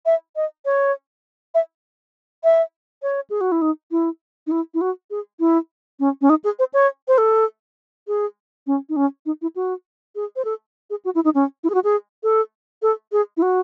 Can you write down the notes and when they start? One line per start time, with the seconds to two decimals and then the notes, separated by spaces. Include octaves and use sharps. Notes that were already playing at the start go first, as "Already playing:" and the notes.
0.06 E5
0.36 D#5
0.65 C#5
1.55 E5
2.44 E5
3.02 C#5
3.30 G#4
3.41 F#4
3.52 E4
3.62 D#4
3.91 E4
4.47 D#4
4.51 E4
4.74 E4
4.81 F#4
5.11 G#4
5.40 E4
6.00 C#4
6.22 C#4
6.30 D#4
6.44 G#4
6.59 C5
6.74 C#5
7.08 C5
7.18 A4
8.08 G#4
8.67 C#4
8.89 D#4
8.96 C#4
9.26 D#4
9.42 E4
9.56 F#4
10.15 G#4
10.36 C5
10.45 A4
10.90 G#4
11.05 F#4
11.15 E4
11.24 D#4
11.35 C#4
11.64 E4
11.70 G#4
11.74 F#4
11.84 G#4
12.23 A4
12.82 A4
13.12 G#4
13.37 E4
13.42 F#4